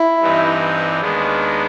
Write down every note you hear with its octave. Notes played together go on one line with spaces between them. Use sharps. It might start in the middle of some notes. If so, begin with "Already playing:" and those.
Already playing: E4
G2 E3 G3 C4 D#4
D#2 D#3 G#3 B3 D4